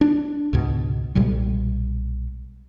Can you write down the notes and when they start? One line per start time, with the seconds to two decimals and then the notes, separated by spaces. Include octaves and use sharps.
0.01 D4
0.53 C#2 G#2 B2
1.15 B1 A#2 G3 G#3